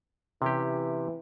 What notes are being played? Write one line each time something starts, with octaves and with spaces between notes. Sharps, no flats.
C3 E3 C#4 G4